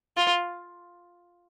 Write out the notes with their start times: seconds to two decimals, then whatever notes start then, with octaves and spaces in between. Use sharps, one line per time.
0.17 F4